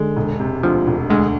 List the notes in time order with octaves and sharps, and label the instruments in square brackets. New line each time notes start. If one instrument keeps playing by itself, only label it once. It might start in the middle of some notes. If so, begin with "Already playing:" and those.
Already playing: [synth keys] D3 [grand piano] G#3
[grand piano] E1
C3
[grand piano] D2 [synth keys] F3
[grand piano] E1
[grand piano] D2 [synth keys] G#3